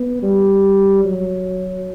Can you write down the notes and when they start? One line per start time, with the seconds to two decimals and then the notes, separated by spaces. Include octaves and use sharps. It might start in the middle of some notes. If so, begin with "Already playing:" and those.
Already playing: B3
0.23 G3
1.04 F#3